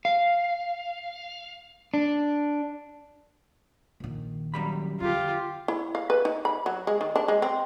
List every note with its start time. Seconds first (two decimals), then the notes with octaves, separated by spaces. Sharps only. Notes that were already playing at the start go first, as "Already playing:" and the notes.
0.05 F5
1.94 D4
4.00 A#1 D#3
4.54 F#2 G3 B5
5.00 F2 D3 F4 G4
5.68 E4
5.95 F5
6.10 B4
6.25 D#4
6.45 B5
6.66 F#3
6.87 G#3
7.01 D#3
7.16 D4
7.28 G#3
7.42 C4